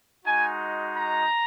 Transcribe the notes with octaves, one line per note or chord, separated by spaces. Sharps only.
G#3 D#4 F#4 G#5
A#5